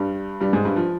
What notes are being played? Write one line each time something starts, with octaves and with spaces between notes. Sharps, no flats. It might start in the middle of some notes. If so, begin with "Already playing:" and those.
Already playing: G2 G3
G2 G3
G#2 G#3
G2 G3
F3